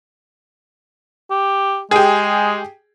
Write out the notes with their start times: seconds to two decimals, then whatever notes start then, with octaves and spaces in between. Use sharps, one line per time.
1.31 G4
1.91 G#3 G4 G#4